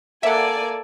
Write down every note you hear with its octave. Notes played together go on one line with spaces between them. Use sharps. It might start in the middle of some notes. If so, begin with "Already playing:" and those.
A#3 A4 D5 E5 F#5 G#5